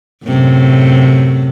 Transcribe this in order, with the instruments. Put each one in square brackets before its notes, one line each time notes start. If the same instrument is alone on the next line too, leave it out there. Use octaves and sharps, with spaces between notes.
[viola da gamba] F#2 A2 C3